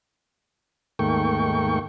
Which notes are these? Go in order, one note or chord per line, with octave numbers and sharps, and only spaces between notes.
D#2 G#2 A3 A#3 G5 C#6